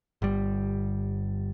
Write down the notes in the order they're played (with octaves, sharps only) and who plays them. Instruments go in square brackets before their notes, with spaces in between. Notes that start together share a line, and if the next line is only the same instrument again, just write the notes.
[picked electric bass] G1 G3